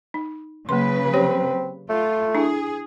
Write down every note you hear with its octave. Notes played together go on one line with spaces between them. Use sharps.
D#4
C#3 F#3 A#3 B4 C6
C4 G4 C#5
A3 F4
D4 E4 G#4